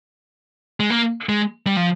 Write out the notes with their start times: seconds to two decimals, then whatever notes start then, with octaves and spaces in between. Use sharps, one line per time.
0.80 G#3
0.90 A#3
1.29 G#3
1.67 G3
1.77 F3